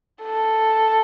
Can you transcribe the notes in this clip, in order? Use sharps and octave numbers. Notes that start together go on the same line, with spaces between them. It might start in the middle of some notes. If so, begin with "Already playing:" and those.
A4